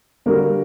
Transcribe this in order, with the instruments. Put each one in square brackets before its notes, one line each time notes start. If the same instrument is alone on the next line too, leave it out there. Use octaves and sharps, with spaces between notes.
[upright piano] D3 G3 A#3 F#4 A#4